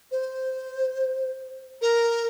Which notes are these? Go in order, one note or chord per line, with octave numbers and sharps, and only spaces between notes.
C5
A#4